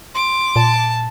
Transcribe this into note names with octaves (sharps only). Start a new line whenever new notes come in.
C6 D6
A#2 A5